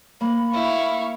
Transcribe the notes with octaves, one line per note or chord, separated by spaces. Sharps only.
A#3 B5
E4 F5 C#6